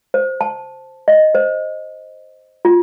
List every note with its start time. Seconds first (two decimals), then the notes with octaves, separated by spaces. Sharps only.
0.14 C5
0.41 A5
1.08 D#5
1.35 C5
2.65 F4